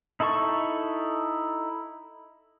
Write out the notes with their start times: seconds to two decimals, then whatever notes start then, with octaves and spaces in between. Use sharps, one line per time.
0.20 D#4 E4 A4 A5 C#6